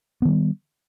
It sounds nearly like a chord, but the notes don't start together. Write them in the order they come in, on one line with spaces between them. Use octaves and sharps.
B3 D#3 G3